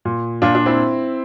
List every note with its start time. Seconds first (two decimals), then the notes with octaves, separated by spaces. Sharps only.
0.05 A#2
0.42 A#2 D4 F4
0.54 D4 F4
0.66 C4 E4